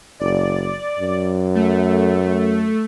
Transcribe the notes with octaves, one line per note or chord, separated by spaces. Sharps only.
F#1 D5
F#2
A3